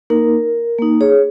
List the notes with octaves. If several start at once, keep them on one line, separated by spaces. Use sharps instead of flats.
A#3 D#4 A#4
A#3 D#4
G#4 C#5